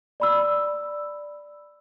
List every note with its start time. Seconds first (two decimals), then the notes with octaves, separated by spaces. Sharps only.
0.20 D5 B5 E6